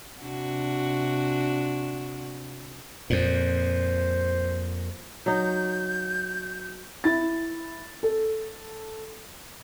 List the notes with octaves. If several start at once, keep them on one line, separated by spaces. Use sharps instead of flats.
C3 D4 F#4
F2 A#2 C5
F#3 D#4 G6
E4 A6
A4